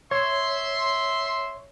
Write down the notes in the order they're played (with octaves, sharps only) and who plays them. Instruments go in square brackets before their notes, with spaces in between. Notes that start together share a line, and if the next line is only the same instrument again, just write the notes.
[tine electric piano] C#5 [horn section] E5 C6